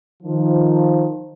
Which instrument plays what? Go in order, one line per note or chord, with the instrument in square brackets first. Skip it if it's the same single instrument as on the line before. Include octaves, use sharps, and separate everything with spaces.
[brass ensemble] D#3 F3